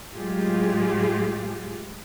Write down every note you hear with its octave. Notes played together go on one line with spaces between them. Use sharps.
A2 F#3 G#3 F4 G4 G#4